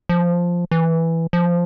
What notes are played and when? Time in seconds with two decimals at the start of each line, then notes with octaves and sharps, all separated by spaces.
0.09 F3
0.71 E3
1.33 F3